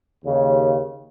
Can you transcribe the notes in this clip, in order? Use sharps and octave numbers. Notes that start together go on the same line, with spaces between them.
D#2 C#3